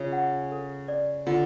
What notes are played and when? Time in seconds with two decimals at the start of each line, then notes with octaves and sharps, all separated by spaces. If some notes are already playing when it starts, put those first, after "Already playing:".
Already playing: C#3 F4
0.13 F#5
0.52 A4
0.88 D5
1.27 D3 F4